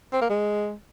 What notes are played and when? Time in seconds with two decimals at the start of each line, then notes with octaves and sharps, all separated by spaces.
0.13 C4
0.21 A#3
0.30 G#3